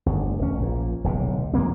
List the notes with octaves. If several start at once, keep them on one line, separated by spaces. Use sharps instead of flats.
G1 D2
E1 C#4
A#1 A#2
D1 B1 C3
F2 F3 A#3 C4